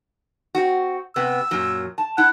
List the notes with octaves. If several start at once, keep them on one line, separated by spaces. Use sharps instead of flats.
C4 F#4
C3 B3 E6
F#2 A#2 F#3
A5
E4 F#5